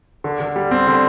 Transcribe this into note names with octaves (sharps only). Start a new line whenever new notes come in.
D3
D3
G3
C4
D3